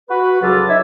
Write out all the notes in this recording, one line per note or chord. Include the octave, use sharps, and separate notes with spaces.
F#4 B4
C#2 F#3 F4 A4 D6
D#4 C#5 E5